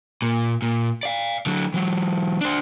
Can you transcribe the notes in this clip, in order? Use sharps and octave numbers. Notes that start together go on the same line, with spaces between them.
A#2
A#2
D5 F5
D3 F#3
E3 F#3
D4 C5